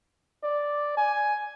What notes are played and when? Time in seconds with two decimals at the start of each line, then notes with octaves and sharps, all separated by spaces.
0.43 D5
0.97 G#5